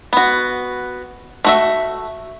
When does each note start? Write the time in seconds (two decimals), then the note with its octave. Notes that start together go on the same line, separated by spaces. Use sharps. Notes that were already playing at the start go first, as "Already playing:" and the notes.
0.13 B3 F#4
1.45 A3 F#4 E5